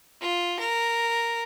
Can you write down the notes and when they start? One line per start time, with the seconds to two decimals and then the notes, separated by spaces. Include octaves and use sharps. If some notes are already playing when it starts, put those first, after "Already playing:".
0.21 F4
0.59 A#4